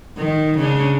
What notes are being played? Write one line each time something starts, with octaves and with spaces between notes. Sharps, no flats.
D#3
C#3 C#4 D4